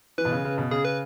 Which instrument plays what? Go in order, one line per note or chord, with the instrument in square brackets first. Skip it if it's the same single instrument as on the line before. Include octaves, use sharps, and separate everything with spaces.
[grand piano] E3 [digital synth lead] B4
[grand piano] B2
C#3
C#3
B2
[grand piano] C#3 [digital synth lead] G#4
[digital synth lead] B4